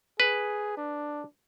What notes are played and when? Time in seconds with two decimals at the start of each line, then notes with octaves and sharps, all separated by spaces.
0.20 G#4 B4
0.77 D4